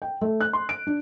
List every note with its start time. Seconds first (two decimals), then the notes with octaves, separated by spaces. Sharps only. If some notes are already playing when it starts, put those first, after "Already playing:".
0.02 G5
0.21 A3
0.40 F#6
0.53 C6
0.69 D7
0.87 D4